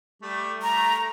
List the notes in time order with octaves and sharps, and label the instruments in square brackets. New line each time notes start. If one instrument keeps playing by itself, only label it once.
[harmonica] G3 A3
[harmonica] A3 [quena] A#5